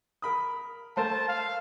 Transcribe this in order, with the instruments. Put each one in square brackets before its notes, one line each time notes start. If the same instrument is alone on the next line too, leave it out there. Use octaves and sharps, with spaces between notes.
[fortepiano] A#4 B5 D#6
[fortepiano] A3 A#4 C5 [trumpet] A5
[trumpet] F5